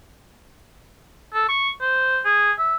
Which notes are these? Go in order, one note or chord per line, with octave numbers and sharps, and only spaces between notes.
A4
C#6
C5
G#4
E5